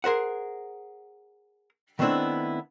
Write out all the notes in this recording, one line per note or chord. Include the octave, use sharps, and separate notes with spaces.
G#4 A#4 C5 F#5
D#3 A3 B3 C4 D4 E4